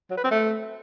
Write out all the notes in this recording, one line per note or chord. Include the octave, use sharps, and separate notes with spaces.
F#3
B4
C4
A3